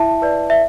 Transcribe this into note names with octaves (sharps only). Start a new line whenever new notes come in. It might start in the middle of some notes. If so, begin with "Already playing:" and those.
Already playing: E4 E5 A5
B4 D5
E5